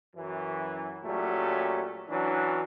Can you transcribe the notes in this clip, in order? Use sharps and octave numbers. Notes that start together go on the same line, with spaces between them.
F#2 E3
A#2 F#3 G3 A3 C#4
E3 F#3 C#4 D4